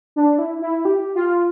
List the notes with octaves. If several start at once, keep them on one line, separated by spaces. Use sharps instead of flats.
D4
E4
E4
G4
F4